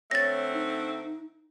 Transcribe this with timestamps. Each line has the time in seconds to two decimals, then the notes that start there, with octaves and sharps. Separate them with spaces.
0.11 D3 A3 C4 C#5 A6 A#6
0.53 D#4